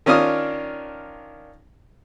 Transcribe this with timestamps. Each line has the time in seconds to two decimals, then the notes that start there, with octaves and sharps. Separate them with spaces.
0.06 D#3 C#4 D4 F4 D#6 F6